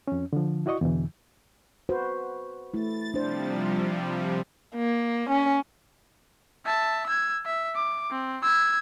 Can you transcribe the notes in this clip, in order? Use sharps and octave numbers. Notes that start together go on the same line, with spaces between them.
F2 C#4
D3 F3
E4 F#4 D5 D#5 C#6
E2 B2 D3 E3
F#4 B4 C5
A3 E4 A6
C3 F3 G3 D4 C5
A#3
C#4
E5 A5
E6 G#6
E5
D6
C4
E6 G#6